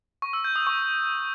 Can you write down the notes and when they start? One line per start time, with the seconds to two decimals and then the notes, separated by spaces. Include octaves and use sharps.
0.22 C#6
0.33 E6
0.44 G6
0.56 D#6
0.67 C#6